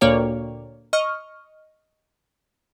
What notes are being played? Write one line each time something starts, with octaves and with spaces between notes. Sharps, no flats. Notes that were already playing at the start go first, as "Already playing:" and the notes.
D2 A#2 A#3 C#5 D5 G5
D#5 C#6 F6